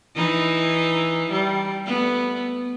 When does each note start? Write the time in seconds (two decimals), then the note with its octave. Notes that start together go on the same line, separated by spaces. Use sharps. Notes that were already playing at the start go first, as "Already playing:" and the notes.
0.16 E3 D#4 E4
1.32 G3
1.86 A3 B3